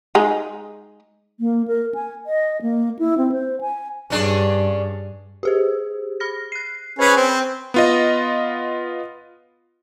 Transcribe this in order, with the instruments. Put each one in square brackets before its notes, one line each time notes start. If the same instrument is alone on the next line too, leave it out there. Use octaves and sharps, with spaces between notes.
[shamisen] G#3 D#4
[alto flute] A#3
A#4
G#5
D#5
A#3
E4
C4
C5
G#5
[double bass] G2 [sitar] C#4 D4 G#4
[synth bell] G4 G#4 C5
B5 F6 A#6
F#6 C7
[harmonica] C#4 G#4 B4 [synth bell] C5
[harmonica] C4
[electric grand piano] B3 F4 D#5